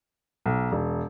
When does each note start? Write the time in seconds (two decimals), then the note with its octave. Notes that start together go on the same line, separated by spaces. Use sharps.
0.46 B1
0.72 E1